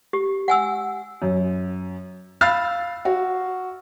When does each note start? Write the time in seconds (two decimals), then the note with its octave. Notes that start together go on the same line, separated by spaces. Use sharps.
0.13 G4
0.48 F#5 G#5 E6
1.22 F#2
2.41 F5 B5 E6 F6 A6 C7
3.05 F#4